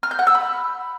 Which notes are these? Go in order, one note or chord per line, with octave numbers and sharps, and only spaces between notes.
F6
G6
F#5
E6
B5